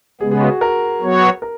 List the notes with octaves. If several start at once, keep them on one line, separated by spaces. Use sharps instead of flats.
C#3 G#3 B3 G#4
G#4
F#4
A#4
F#3 B3 F#4 C#5
A#4